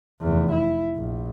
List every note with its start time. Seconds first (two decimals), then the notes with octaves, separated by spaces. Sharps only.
0.21 F1 E2
0.52 E4
0.96 A#1